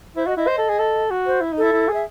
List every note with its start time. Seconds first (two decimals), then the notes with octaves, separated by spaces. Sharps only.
0.16 E4 C5
0.27 F#4 D#5
0.37 E4 D#5
0.48 C5
0.58 A4
0.69 G#4
0.79 A4
1.10 F#4
1.26 C5
1.41 E4
1.52 D#4
1.58 E4 A4
1.73 E4
1.89 G#4
1.94 E5